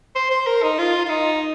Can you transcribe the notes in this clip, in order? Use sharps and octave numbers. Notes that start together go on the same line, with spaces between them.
C5
C5
A#4
D#4
F4
F4
D#4